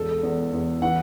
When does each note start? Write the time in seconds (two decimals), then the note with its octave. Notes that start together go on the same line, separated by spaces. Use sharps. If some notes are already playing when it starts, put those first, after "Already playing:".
Already playing: E1 A4
0.23 E2
0.53 E2
0.82 E3 F#5